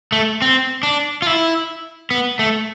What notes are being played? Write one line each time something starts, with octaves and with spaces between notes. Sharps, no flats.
A3
C4
D4
F4
E4
B3
A3